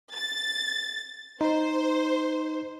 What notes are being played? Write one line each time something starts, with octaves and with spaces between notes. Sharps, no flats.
A6
D#4 C5